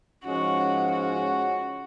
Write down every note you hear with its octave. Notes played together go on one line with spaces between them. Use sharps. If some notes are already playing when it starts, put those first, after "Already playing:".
G#2 F3 G#3 C#4 F#4
F#4